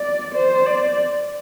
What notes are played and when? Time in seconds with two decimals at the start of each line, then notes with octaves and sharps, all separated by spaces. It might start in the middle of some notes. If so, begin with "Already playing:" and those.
Already playing: D5
0.35 C5
0.66 D5